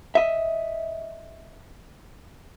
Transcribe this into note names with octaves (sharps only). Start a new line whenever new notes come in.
D#5 E5